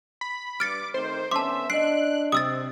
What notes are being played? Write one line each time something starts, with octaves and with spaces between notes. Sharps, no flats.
B5
G2 D6 F6 A6 C#7
D#3 A3 C4 C5
D3 B3 C#4 E5 A5 C6 D6
D4 D#5 F#6 C7 D7
C3 D#6 E6 A6